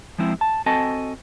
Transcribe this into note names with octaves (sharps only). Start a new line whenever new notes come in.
F3 G#3 C4 E4
A5
C4 F#4 A4 D#5 G#5 A5